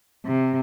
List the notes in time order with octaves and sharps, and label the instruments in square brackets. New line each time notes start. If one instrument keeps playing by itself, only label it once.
[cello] C3